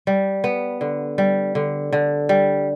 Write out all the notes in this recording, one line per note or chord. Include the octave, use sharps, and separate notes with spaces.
G3
B3
D3
G3
D3
D3
G3